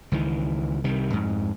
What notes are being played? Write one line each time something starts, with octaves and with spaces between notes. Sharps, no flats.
C#2 D#3 E3
C2 C3 D#3 G3
F2 G#2